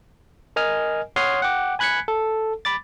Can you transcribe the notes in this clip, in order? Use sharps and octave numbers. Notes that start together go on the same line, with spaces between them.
A#4 D#5 G#5 F6
C#5 F#5 C6 D#6 F6 C7
F#5 G5 D6
G#5 B5 F#6 G#6 B6 C#7
A4
B5 D6 A6